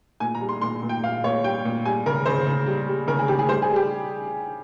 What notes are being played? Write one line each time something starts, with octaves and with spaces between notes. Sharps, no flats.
A#2 G#5
A#5
G3
C6
A#2 C6
A#2
G5
A#2 F5
A#2 C#5
G3 G5
A#2
G3 G#5
C#3 A#4
C#3 C5
C#3
G3
G3
C#3 A#4
G#4
C#3 G4
G#4
G3 C5
G#4
G3
G4